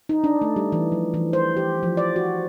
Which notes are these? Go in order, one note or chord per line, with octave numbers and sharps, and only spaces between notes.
D#4
D4
A3
G3
E3
F3
E3
C5
G4
F3
D5
F#4